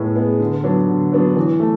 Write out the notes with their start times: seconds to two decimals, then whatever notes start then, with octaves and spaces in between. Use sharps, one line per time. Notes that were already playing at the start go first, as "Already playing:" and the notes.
Already playing: A2 G#3 B3
0.16 G#3 B3
0.40 D3
0.63 F#3 B3 D4
0.88 D3
1.12 F#3 B3 D4
1.36 E3
1.60 A3